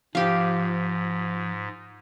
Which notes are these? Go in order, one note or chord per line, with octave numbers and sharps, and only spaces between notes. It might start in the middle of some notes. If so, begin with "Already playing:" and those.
G#2 F3 G4 F5